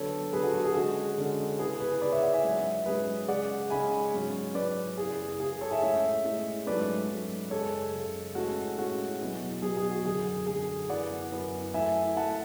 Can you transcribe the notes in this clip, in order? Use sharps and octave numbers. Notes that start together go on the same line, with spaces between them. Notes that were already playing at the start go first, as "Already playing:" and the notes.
Already playing: D3 F#3 B3 D4 A4 C#5
D3 F#3 B3 D4 G#4 B4
F#4 A4
F#4
G#4
D3 G#3 C#4 F#4
D3 G#3 C#4
C#3 E3 B3 G#4
G#4 B4
C#3 E3 B3 B4 D5
C#5 E5
D5 F#5
E5 G#5
G#2 F#3 C#4 C#5 E5
G#2 F#3 C#4 G#4 B4
C#3 G#3 C#4 D5 F#5
C#3 G#3 C#4 G#5 B5
G#2 F#3 C#4
G#2 F#3 C#4 B4 D5
F#2 C#3 E3 B3 G#4
F#2 C#3 E3 B3 G#4
A4 C#5
E5 G#5
A2 G#3 C#4 C#5 E5
A2 G#3 C#4
G#2 F#3 A3 C#4 B4 D5
G#2 F#3 A3 C#4
F#2 C#3 G#3 A4 C#5
F#2 C#3 G#3
A2 G#3 C#4 F#4 A4
A2 G#3 C#4 F#4
E2 B2 F#3
E2 B2 F#3 G#4
G#4
F#4
F#2 D3 F#3 G#4
F#2 D3 F#3 G#4
F#2 E3 B3 D5 F#5
F#2 E3 B3
F#2 E3 A3 E5 G#5
F#2 E3 A3 F#5 A5